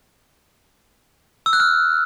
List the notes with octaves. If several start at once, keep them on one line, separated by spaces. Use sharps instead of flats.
E6
F#6
F6